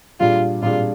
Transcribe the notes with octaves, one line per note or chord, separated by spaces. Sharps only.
A#2 G3 D4 F4 G#4 D5
A#2 G3 D4 F4 G#4 D5